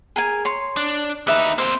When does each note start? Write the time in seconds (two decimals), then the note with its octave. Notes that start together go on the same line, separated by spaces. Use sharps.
0.16 G#4 A#4 G#5
0.45 C#5 C6
0.77 D4
1.27 D#2 D#4 B4 E5
1.58 A#3 C4 C5 C6